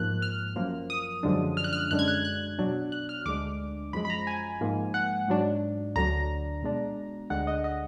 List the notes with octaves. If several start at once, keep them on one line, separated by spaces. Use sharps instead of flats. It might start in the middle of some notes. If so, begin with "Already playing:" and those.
Already playing: G#2 F3 A#3 F#6
F6
F#2 F3 A#3
D#6
F#2 D3 F3 G#3 D4
F6
F#6
F6
F#2 D3 G#3 D4 F#6
G#6
F#6
F#6
B2 F#3 D4
F#6
F6
D2 D3 G#3 D4 D6
F#2 F3 G#3 B5
B5
A#5
G#5
G#2 F3 A#3
F#5
G#2 F#3 D4
D2 D3 F#3 D4 A#5
B2 G#3 D4
D2 D3 G#3 D4 F#5
D#5
D#5